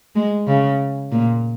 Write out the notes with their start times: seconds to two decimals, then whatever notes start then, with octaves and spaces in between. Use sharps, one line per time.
0.15 G#3
0.47 C#3
1.12 A#2